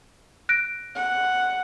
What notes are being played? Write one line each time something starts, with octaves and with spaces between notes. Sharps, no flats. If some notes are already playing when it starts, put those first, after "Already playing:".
F#6 A#6 D7
F#5